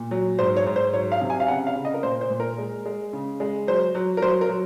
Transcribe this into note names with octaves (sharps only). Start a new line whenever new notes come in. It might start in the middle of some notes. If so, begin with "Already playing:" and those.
Already playing: A#2
F#3
G#2 C5
C#5
G#2
C5
F#3 C#5
F5
C3
G#5
F5
C#3 F#5
F5
C#3
D#5
A#4
A#2 C5
C5
A#2
A#4
G#3
G#3
C#3
G#3
F#3 C5
F#3
A#4
F#3 C5
A#4
F#3